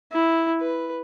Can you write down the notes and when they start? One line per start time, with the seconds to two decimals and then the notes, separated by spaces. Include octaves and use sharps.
0.12 E4
0.61 B4